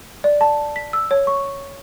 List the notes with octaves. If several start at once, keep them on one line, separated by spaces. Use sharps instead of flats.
D5
A5
B6
E6
C#5
C#6